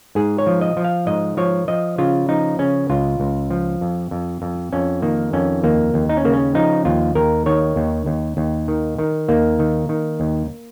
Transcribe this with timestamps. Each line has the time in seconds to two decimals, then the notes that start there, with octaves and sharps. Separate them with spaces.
0.15 G#2 G#4
0.38 C#5
0.47 F3
0.61 D#5
0.77 F3
0.84 F5
1.07 G#2 D#5
1.37 F3 C#5
1.68 F3 D#5
1.98 C#3 F4
2.29 F3 D#4
2.59 C#3 C#4
2.90 C#2 F4
3.20 C#2
3.50 F3
3.81 F2
4.11 F2
4.42 F2
4.72 F2 C#4
5.02 D#3 A#3
5.33 F2 C#4
5.63 D#2 A#3
5.94 D#2
6.09 D#4
6.17 C#4
6.25 C#3 A#3
6.33 C#4
6.55 F3 D#4
6.85 D#2 F4
7.15 D#2 A#4
7.46 D#3 C#5
7.76 D#2
8.06 D#2
8.37 D#2
8.68 D#3
8.98 D#3
9.28 D#2 A#3
9.59 D#3
9.89 D#3
10.20 D#2